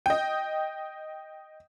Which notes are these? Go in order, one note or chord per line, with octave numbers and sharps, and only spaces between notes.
D#5 G5